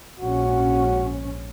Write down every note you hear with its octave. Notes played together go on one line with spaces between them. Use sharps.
A#1 G#2 C#4 F#4